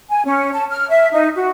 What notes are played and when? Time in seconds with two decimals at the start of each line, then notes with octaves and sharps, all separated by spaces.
0.09 G#5
0.25 C#4
0.53 A5
0.70 F6
0.89 E5
1.13 D#4
1.36 F#4